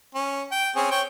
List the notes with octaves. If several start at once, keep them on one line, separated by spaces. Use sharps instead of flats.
C#4
G5
C4 C#4 G#4
C#5 G5